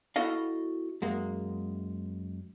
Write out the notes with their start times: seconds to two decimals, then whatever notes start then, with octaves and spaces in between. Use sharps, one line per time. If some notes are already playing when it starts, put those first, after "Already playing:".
0.16 B3 E4 F#4 A4 D#5 F5
1.02 F#2 G#3 A#3